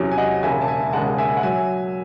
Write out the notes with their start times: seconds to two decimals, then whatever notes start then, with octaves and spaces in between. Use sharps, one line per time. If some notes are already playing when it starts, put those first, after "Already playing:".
Already playing: E2 C3 F#3 C#4
0.11 G#5
0.18 D#5 F#5
0.43 E1 D#2 C#3 E5 G#5
0.61 A5
0.68 E5 G#5
0.92 E1 D#2 C#3 G#3 F#5 A5
1.18 E5 G#5
1.37 F#5
1.43 F#3 E5 G#5